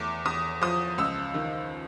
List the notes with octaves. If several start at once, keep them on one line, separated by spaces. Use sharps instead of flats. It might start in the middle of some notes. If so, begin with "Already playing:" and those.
Already playing: E2 A3 D6
E2 D#6
F3 D#6
C#2 E6
D#3